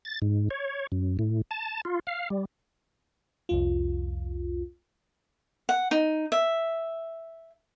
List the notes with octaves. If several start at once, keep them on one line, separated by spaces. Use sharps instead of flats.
A6
G#2
C#5
F#2
A2
A5
F4
F5
G3
C2 F2 F4
F#5
D#4
E5